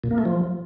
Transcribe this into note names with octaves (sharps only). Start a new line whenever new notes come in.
A#2
A#3
A3
F3